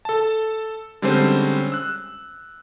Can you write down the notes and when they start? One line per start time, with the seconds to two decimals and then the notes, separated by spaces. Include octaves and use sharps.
0.05 A4 A5
1.02 D3 G3 G#3 C4 C#4 C5
1.72 E6 F#6